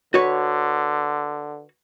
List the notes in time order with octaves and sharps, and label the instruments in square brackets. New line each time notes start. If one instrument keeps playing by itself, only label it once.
[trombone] D3 [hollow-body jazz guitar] F#4 B4 C#5